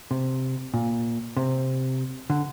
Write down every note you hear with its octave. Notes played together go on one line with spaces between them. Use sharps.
C3
A#2
C3
D3